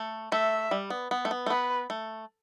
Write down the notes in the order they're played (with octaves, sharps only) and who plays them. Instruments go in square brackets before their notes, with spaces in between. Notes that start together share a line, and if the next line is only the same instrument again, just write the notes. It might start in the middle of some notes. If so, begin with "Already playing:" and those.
Already playing: [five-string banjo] A3
[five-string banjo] A3 [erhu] E5
[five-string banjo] G3
B3
B3
A3
B3
A3
[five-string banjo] B3 [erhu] B4
[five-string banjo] A3